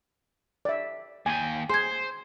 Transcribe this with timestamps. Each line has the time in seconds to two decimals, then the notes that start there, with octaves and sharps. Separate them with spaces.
0.65 D5 E5
1.26 D#2 G5 G#5
1.70 G#4 C5 C6 G#6